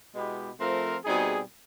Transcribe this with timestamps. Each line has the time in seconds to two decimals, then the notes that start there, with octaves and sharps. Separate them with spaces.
0.15 B2 G#3 B3 E4 G4
0.60 F3 A3 C4 F4 A#4
1.05 B2 G3 C4 D#4 G#4